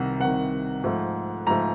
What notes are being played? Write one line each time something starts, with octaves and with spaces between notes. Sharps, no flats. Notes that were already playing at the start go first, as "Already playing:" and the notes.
Already playing: C2 C3 D#3 F#5
C2 C3 D#3 F#5
G#2 F3 A3
G#2 F3 A3 A#5